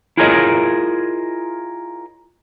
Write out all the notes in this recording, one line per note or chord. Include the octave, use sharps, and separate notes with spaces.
E4 F4 G#4 A#4 C#5 D#5